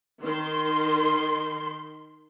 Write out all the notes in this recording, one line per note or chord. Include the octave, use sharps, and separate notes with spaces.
D#3 C6